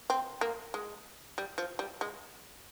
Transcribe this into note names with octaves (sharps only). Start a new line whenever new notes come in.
C4
A#3
G#3
G3
F3
G3
G#3